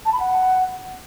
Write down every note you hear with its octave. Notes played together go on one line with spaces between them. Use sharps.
A5
B5
F#5